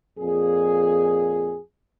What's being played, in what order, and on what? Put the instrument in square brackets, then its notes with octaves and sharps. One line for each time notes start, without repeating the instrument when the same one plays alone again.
[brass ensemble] F2 A#2 G#4